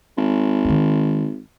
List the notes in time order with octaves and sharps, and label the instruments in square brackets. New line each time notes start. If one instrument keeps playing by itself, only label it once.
[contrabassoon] G#1
[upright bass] D#3 G#3